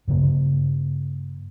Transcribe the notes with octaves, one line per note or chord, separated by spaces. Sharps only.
G2 C#3 A#3